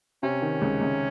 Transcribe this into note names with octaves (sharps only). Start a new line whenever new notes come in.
C3 C#4
D#3
C#2
C#2